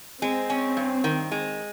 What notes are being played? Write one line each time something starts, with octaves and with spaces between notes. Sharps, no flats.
G#3 C4
C#4
G2
D#3
G#3